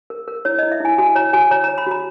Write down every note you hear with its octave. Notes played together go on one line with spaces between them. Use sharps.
A#4
A#4
E4 C#5
D#5
E4
E5
E4 G#5
F#4 G#5
C#5 A#5
F#4 G#5
C#5 A#5
A#5
C#5
B5
F#4 A#5